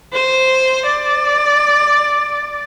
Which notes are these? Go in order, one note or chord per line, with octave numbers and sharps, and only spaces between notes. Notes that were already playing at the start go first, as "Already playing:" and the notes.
C5
D5